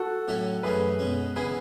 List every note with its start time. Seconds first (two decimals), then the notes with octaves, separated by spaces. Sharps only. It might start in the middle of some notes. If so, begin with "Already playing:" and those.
Already playing: F#4 A4
0.28 A2 F#3 C#4 E4 A4
0.63 F#2 E3 A3 C#4 G#4 B4
0.99 B2 G#3 C#4
1.36 C#3 E3 B3 E4 G#4 B4